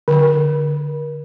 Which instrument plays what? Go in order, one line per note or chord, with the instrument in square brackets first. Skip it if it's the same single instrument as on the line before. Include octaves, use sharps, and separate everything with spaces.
[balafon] D3